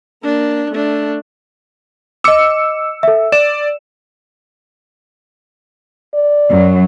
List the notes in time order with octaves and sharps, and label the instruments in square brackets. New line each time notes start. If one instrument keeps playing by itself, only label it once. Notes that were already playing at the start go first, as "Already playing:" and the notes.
[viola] A#3 D4
A3 D4
[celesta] D#5 D6 [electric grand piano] E6 C#7
[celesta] A4 E5
[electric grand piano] D5 [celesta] E7
[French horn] D5
[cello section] F#2 F#3